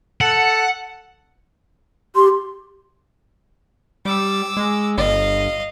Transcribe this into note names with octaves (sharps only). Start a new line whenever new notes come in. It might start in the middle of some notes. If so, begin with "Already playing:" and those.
A4 F#5
G4 C6
G3 D6 E6
G#3
G1 D#5 F5